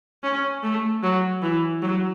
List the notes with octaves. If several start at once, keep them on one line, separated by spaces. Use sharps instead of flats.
C#4
A3
F#3
E3
F#3